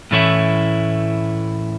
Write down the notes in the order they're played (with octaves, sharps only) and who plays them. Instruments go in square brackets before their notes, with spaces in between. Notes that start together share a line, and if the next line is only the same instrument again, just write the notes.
[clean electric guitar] A2 E3 A3 C#4 E4